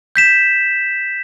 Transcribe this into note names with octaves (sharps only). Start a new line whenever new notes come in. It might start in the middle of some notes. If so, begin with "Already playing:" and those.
G6 B6 E7